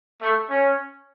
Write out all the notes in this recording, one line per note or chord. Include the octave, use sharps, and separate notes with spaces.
A3
C#4